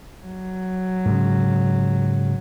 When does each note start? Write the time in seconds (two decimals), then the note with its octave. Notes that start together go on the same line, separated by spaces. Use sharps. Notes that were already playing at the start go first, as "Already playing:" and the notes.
0.25 F#3
1.06 G#2 C#3